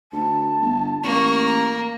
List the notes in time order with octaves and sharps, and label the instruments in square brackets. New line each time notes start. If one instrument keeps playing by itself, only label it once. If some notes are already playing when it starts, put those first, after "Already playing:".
[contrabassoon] D2 [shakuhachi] A5
[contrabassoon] G1
[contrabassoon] A1 [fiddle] A#3 [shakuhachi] C#6
[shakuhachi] A#5